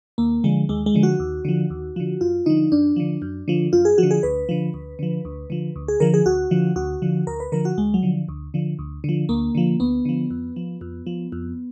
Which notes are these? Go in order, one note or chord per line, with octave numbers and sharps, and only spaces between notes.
D#2 A#3
D3 F3 G#3
D#2 G#3
G#3
D3 F3
F#4
D#2
D3 F3
D#2
D3 F3
F#2 F4
D3 F3 D#4
F#2 D4
D3 F3
F#2
D3 F3
F#2 F4
G#4
D3 F3 F#4
G#4
D2 B4
D3 F3
D2
D3 F3
D2
D3 F3
D2
G#4
D3 F3 A#4
G#4
D2 F#4
D3 F3
D2 F#4
D3 F3
D2 A#4
B4
D3 F3 A#4
F#4
D2 G#3
F#3
D3 F3
D2
D3 F3
D2
D3 F3
D2 A#3
D3 F3
D2 B3
D3 F3
F2
F3
F2
F3
F2